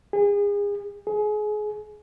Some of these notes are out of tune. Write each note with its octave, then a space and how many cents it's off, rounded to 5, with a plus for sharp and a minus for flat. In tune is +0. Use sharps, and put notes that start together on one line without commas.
G#4 -35
G#4 +25